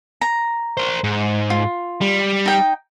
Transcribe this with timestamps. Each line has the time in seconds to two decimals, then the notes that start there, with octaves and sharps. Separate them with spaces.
0.21 A#5
0.77 A#4 C5
1.04 G#2
1.50 F4
2.01 G3
2.46 D#4 G5